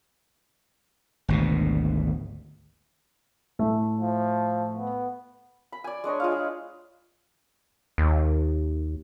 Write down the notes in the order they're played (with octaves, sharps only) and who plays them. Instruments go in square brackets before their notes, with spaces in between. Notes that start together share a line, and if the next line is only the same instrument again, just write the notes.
[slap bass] G#1 D2 B2
[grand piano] A2 A3 E5
[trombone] F3
B3
[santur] B5
D5 G#5
G#3 D4 C#5 D#5
G#3 F4 F5
G#4
[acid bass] D#2